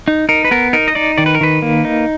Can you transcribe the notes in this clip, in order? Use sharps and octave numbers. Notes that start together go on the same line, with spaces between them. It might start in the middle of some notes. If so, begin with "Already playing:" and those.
D#4
D#4 A#4
B4
B3 A#4
D#4 A#4
D#5
D#4 D5
D#3 D5
B4
A#4
D#3 B4
A#3
D#4